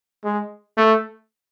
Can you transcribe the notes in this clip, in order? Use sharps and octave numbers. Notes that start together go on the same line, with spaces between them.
G#3
A3